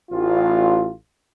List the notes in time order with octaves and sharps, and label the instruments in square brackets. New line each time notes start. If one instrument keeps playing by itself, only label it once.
[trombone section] A1 F4